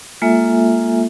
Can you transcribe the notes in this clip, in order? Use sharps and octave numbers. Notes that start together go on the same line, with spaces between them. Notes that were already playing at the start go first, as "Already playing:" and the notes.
G#3 A#3 F4 A4 E5 G#5